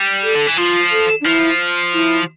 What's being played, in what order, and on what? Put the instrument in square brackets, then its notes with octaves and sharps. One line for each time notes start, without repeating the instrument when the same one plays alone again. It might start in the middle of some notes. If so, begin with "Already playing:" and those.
Already playing: [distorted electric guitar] G3
[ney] A4
[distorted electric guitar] D3
E3
[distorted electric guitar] F3 [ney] F4
[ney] A4
D4
[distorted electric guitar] F3 [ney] E4
[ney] E4